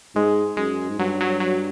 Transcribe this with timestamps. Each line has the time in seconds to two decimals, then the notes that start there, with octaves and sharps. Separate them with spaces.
0.15 G#2 G#3
0.57 F#2 G#3
0.89 G#2
0.99 G2 F#3
1.21 F#3
1.40 F#3